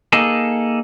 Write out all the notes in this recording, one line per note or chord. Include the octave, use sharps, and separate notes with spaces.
A#3 D#4 G#4 A4